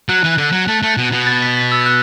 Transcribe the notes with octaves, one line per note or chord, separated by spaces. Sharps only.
F#3 F#6
E3
D3
F#3
A3
A3
B2
B2
A6
B6
B6
E6
F#6